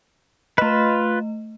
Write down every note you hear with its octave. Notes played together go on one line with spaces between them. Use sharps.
A3 F4 B4 D#5